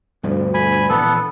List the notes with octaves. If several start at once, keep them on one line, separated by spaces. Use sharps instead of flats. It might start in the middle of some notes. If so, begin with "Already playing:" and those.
D2 G2 B2 F3
G#5 B5
A#1 E3 B3 A4